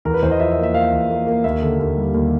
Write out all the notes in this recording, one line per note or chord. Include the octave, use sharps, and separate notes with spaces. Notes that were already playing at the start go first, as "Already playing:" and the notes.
E2 A#4
B4
E2 C5
D#5
F3 E5
E5
A#3
E5
A#3 F5
E2
A#3
A#3
D#2 E5
D3
D#2
G3
D#2